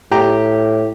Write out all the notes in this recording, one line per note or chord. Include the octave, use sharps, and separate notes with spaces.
A2 G4 A#5